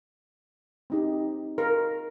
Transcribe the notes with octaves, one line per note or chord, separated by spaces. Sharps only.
C4 D#4 G4
A#4